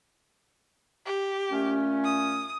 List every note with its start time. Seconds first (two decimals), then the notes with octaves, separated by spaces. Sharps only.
1.06 G4
1.51 A#2 A3 C#4
2.05 D#6